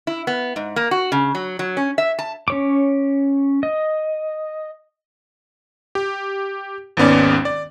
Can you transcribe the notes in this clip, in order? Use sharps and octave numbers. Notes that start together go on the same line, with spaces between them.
E4
B3
G#2
A#3
F#4
C#3
F#3
F#3
C#4
E5
A5
C#4 C#5 D6
D#5
G4
G#1 D#2 G#2 B3 C#4 D5
D5